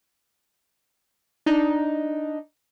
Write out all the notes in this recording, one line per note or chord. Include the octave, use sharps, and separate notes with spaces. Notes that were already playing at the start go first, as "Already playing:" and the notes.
D4 D#4